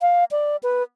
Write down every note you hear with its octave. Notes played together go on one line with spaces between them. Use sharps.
F5
D5
B4